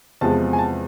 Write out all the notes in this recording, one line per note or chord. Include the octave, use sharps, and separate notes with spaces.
E2 C3 F3 G#3 A5
G#5
A5